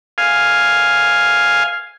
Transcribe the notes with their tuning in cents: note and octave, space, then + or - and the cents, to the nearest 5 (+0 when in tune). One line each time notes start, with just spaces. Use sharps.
F5 +0 G#5 -5